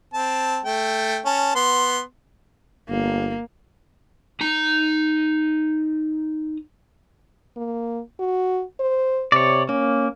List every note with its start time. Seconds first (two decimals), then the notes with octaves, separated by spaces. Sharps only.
0.14 C4 A5
0.65 A3 G5
1.25 C#4 A5
1.55 B3 C6
2.89 G1 A#3
4.41 D#4 A#5
7.56 A#3
8.19 F#4
8.80 C5
9.32 C3 C#5 D5
9.69 A#3 C#4